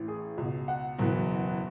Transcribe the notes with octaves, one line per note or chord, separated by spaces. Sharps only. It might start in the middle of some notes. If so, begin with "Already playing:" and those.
Already playing: A1 A2 E3
G#4
C#2 B2
F#5
F#1 E2 B2